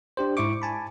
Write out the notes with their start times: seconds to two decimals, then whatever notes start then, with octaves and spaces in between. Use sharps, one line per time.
0.17 D4 G4 C5
0.37 G#2 E4 E5 C#6 D6
0.62 G#5 A5 B5